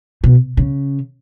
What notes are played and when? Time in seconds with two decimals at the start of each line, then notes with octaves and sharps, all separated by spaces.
0.24 B2
0.57 C#3